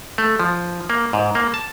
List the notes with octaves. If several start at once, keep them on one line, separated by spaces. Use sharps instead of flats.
A3
F3
A#3
G#2
A#3
A5